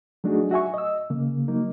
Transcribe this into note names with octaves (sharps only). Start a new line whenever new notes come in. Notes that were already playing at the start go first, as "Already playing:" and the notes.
F#3 A3 D4 D#4 F#4 G#4
F#4 E5 G#5 C#6
D#5 E6
C#3 A#3
F#3 A#3 D#4